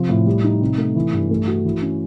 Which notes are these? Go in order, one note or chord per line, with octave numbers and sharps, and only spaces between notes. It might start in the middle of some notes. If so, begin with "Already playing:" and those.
Already playing: C3 F3
A2
G3
D#4
C3
A3
E3
G2
A3
F#4
E3
C#4